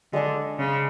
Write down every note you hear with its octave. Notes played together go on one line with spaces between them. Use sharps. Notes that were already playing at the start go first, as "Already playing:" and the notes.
D3 G#3 D4 G#4 D5
C#3